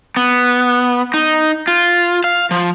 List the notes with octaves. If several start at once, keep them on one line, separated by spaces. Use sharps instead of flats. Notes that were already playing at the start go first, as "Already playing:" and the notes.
B3
D#4
F4
F5
F3